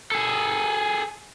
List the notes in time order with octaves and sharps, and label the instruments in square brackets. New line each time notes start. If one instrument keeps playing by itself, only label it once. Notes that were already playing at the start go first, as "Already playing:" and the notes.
[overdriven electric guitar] G#4 A4